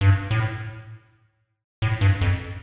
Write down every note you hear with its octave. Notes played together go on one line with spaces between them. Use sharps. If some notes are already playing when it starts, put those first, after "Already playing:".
G2
A2
A2
G2
F2